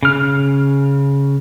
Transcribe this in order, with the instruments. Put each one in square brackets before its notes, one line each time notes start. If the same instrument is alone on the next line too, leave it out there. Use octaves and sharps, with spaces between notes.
[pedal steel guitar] C#3 F6